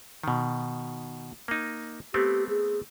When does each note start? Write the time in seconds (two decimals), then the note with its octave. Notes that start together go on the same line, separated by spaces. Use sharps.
0.23 B2 D#3
1.48 A#3 D#4
2.14 A3 B3 C4 G4
2.49 G#4